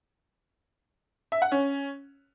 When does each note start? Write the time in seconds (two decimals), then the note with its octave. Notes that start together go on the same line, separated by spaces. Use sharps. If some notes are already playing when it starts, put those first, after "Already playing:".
1.32 E5
1.42 F#5
1.52 C#4